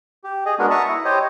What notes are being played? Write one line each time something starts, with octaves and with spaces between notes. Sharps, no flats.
G4
G#4 D#5
G#3 B3 D4 F#4 A#4
E5 A5 A#5 C#6 D#6
E4
G4 C5 C#5 D#5